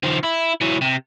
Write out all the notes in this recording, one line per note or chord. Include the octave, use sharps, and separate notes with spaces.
D#3 F3
E4
E3 F#3
C3